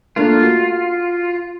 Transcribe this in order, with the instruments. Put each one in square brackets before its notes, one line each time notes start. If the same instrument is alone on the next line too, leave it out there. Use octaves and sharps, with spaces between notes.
[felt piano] A3 A#3 D4 [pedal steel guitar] F4
[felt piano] F#4